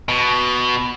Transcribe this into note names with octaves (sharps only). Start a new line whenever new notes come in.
B2